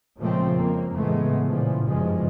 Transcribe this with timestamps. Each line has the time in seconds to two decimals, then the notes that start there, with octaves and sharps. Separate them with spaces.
0.18 A#2 C#3 F3 G#3 A3 C4
0.53 F2 A#3
0.93 A2 C#3 E3 G#3 A3 B3
1.47 A#2 C#3 E3 F3
1.84 F#1 B1 G2 C#3 F3 G#3